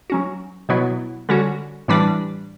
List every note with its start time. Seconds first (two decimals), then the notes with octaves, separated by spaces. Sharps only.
0.10 F#3 C#4 F#4
0.69 B2 F#3 B3 E4
1.29 D3 G3 C#4 F#4
1.88 A2 E3 G3 D4